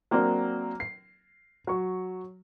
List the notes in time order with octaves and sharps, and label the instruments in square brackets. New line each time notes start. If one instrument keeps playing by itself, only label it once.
[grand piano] F#3 A#3 C4 D4
C7
F#3 C#6